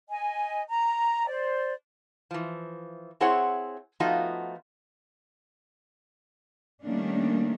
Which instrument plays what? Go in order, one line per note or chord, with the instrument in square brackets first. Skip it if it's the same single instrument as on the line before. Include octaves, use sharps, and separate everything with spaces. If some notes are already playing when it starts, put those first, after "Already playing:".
[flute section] D#5 G#5
A#5
C5 D5
[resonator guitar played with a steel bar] E3 F3
C4 E4 G#4 C5 C#5 F#5
F3 A3 B3 D#4 F4 F#4
[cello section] D#3 G3 A3 A#3 C#4 D4